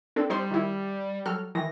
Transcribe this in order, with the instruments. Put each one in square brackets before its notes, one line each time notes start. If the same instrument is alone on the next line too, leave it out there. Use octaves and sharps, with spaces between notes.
[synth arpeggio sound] C4 D4 A4
[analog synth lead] G3 [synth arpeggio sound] D#4 C5 C6
[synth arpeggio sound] D#3 E4
F#3 A4 F6
[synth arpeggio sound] D#3 E3 [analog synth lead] A#6